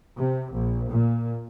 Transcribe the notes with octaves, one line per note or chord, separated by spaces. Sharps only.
C3
A#1
A#2